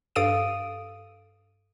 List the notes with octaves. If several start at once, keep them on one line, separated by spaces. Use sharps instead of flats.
G2 A4 F5 D#6 D7 D#7